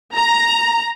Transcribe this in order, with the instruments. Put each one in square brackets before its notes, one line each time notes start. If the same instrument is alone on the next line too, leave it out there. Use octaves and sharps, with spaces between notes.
[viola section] A#5